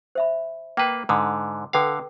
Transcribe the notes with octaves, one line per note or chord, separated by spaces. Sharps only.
C5 E5 B5
A#3 B4 G5 A#5
G#2 D3 D#6
D3 A4 B4 F5 G5